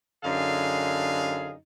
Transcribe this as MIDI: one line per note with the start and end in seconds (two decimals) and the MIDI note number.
0.24 1.55 42
0.24 1.55 50
0.24 1.55 63
0.24 1.55 68
0.24 1.55 77